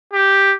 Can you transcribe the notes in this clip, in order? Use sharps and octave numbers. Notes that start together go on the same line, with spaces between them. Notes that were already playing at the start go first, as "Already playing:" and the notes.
G4